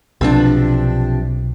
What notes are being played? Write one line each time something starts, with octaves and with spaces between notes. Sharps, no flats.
B1 C3 F3 D4